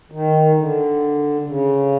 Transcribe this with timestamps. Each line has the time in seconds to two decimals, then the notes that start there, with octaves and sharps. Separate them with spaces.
0.11 D#3
0.57 D3
1.46 C#3